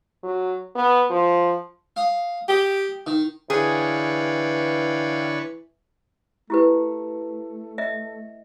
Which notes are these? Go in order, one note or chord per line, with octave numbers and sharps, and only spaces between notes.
F#3
B3
F3
F5 D#6
G4 D#6
D#3
D3 E3 G#4 B4 C#5 F5 G5
A3 E4 G4 B4
D#5 E5